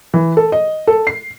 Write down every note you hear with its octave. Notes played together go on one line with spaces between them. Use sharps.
E3
A4
D#5
A4
C7